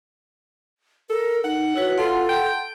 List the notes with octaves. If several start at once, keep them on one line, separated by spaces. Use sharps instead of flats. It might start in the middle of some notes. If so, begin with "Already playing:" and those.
A4 A#4
D#4 F#5
E4 F#4 B4 C#5
F4 A4 F#5 A5 C6
G5